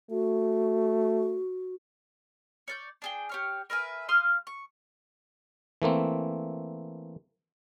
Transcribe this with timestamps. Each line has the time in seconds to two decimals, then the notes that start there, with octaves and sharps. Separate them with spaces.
0.11 A3 F#4
2.68 C#5 D5 G6
3.02 D4 G#4 G5
3.29 G4 C#5 F5
3.70 A#4 B4 E5 G#5
4.09 F5 C6 D#6 F6
4.47 C#6
5.82 E3 A3 A#3 C4